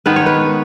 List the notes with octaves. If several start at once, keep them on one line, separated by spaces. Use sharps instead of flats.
D#3 G#3 B3 D#4 B4
C#5
B4